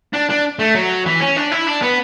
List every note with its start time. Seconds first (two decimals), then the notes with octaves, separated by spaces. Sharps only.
0.14 D4
0.30 D4
0.59 A3
0.75 F#3
1.06 E3
1.20 C#4
1.36 D4
1.51 E4
1.67 D4
1.82 B3